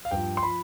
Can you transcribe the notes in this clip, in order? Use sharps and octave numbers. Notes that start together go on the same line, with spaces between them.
F5
G2 F3 G5
C6
F3 B5